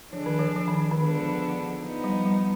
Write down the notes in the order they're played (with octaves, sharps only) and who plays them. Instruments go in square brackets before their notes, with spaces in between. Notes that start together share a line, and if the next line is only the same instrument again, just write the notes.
[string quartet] D3 G#3 D4 [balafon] F3
[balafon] D#3
F3
F3
D#3
D#3
[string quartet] D3 F3 G#3 B3 D4
F3 B3 D#4
[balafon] G3
G3